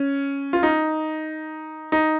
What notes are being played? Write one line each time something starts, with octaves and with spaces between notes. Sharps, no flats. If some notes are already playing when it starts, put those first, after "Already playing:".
Already playing: C#4
F4
D#4
D#4